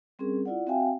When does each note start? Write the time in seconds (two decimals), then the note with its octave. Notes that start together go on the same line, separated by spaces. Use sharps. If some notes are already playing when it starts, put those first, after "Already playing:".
0.19 G3 C4 C#4 G#4 A#4
0.46 E4 F4 D5 F#5
0.67 C4 F#4 E5 F5 G5 G#5